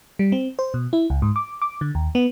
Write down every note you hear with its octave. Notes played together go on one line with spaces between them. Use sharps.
G3
C4
C5
B2
E4
C#2
G#2
D6
D6
D3
D#2
B3